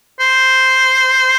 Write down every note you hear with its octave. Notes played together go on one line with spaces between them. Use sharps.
C5